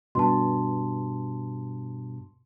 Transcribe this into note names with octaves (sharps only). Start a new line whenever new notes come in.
G2 B2 A5 C6